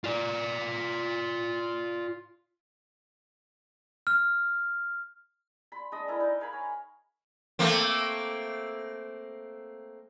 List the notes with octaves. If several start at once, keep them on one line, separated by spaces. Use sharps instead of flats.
F4 D5
F6
B5 C6
G#3 D4 D#5 D#6
E4 A4 A#4 D5
D#4
A#4 F5 G#5 B5
C#5
A3 A#3 C4